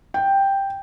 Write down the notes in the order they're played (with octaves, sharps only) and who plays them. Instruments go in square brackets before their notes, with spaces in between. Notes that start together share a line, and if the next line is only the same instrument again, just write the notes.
[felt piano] G5